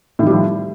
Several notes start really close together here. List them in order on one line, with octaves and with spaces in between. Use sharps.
A2 D#3 G3 F3